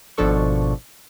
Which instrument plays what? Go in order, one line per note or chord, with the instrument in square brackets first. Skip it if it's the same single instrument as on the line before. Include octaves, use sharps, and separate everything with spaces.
[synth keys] G#1 B2 F3 D4 A4 C#6